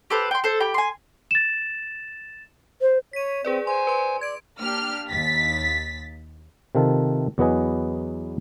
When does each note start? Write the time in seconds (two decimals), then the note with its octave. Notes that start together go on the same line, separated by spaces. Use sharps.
0.10 G4 A4 B4 C5
0.31 G5 C6
0.44 A4 C5
0.60 G4 G5 B5
0.74 G#5 C6
1.31 A6 E7
2.82 C5
3.13 C#5 B6 D#7
3.45 C4 G#4 B4 D5
3.67 C5 G#5 C6
3.87 B4 C6
4.21 D5 G#6 D7
4.59 A#3 D4 G4 F6
5.09 D#2 A6 B6
6.75 C3 D#3 F4 A4
7.38 E2 F#3 B3 B4 D#5 G#5